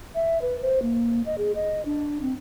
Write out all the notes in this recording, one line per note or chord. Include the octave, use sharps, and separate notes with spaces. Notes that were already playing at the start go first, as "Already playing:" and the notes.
E5
B4
C5
A#3
D#5
G#4
D#5
D4
C4